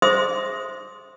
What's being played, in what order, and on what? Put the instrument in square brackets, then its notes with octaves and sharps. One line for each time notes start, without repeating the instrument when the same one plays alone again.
[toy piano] G#4 C5 E5 C6 D#6